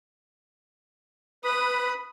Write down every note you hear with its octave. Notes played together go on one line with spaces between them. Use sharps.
B4 B5 D#6